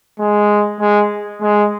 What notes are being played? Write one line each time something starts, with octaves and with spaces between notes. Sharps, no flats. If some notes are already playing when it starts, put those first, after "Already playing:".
G#3
G#3
G#3